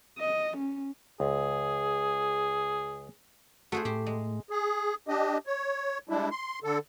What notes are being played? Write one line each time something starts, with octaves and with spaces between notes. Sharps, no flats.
D#5
C#4
C#2 G#4
A3 F#4 G#4 C5
A2 G4 C5
G#3
G#4
D4 G4 D#5
C#5
G3 G#3 D4 E4
C6
D3 A4